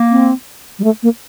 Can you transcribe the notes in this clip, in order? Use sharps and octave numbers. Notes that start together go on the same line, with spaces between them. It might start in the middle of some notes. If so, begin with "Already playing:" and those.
Already playing: A#3
C4
G3
A3
A#3